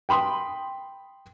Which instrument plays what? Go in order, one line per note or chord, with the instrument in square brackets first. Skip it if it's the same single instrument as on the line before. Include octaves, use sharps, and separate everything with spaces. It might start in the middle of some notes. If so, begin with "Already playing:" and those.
[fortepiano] G5 B5 C6 D#6